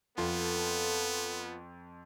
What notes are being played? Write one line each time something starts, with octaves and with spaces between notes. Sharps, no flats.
F2 B3 F4 A4